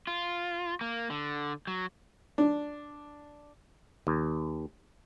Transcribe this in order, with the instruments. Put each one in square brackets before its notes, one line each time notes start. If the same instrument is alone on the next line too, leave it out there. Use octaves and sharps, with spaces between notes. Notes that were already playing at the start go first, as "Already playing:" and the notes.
[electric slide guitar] F4
A#3
D3
F#3
[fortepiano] D4
[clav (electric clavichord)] D#2